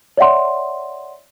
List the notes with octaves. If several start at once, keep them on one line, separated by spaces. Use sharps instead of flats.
C#5 D5 E5 F#5 C6